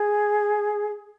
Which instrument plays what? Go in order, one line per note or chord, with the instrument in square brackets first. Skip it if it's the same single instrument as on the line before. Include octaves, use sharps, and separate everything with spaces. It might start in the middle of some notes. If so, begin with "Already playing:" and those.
Already playing: [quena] G#4